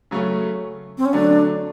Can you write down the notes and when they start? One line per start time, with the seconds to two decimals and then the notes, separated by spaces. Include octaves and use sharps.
0.11 C#3 F#3 A3 C#4
0.98 C4
1.05 C#4
1.13 D3 F#3 A3 D4